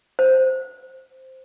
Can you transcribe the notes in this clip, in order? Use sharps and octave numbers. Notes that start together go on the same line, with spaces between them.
C5